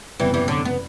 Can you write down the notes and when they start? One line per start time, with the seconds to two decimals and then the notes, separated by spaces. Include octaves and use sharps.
0.20 F#1 E2 C3 E3 G3
0.34 E3 G3
0.48 D3 F#3
0.65 B3